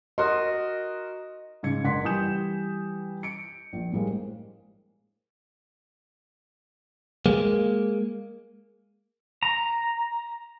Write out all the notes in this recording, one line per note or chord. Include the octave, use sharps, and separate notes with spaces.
F#4 A#4 D#5 C6
G#2 C#3 G#6 C#7
F#1 D4 F#5 C6 B6
E3 G3 G#5 D#6 G6 E7
C#7 D7
A#1
A2 G3 G#3 A#3 C5
G#3 A#3
A#5